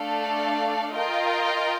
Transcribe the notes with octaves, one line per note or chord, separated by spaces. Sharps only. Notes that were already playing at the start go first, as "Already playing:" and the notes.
Already playing: A3 D4 A4 D5 F5
F4 A#4 D#5 G5